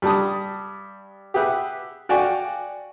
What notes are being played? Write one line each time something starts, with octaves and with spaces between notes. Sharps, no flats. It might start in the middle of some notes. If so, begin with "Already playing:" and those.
G2 G3 A5 D#6
G4 G#4 B4 E5 F#5
F#4 D5 F5 G5 G#5